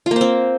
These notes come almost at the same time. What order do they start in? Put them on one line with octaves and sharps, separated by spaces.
F4 A#3 C5 C4